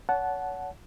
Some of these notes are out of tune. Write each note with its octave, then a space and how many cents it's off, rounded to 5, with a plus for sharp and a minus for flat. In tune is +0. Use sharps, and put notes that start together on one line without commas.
C#5 +30 F#5 +0 A5 -20